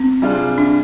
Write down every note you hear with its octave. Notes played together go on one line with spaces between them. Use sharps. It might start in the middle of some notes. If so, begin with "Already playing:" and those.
Already playing: C4
C3 G3 D4 F4 G#4
D4